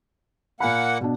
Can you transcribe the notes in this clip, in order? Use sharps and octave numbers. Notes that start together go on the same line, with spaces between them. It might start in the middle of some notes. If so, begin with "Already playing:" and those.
A#2 A#3 F#5 G#5 B5
B2 D4